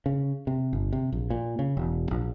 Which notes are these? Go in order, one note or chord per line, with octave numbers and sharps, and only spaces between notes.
C#3
C3
G1
C3
A#1
A#2
C#3
E1
A#1